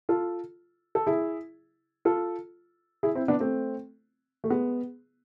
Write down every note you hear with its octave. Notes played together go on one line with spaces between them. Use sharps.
F4 A4
A4
E4 G#4
F4 A4
E4 G#4
C4 E4
B3 D4
A3 C4
A3
G#3 B3